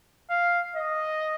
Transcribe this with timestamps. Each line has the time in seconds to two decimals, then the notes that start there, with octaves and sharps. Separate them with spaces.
0.30 F5
0.76 D#5